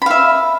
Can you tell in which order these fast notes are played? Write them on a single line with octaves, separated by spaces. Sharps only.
B5 F5 E5